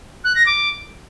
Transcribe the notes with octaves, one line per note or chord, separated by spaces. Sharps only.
F#6
A#6
D6